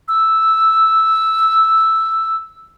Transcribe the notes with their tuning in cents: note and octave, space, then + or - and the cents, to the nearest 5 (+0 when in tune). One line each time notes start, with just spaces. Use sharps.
E6 -5